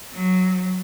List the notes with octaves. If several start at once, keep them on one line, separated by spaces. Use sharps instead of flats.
F#3